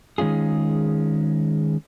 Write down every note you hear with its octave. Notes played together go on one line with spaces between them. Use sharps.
D#3 G#3 C#4 F4 G#4